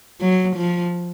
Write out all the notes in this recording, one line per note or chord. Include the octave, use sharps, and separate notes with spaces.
F#3
F3